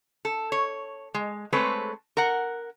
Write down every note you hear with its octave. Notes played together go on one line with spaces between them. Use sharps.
A4
C#5
G#3
G#3 A3 C4 A4 B4 C#5
A#4 F#5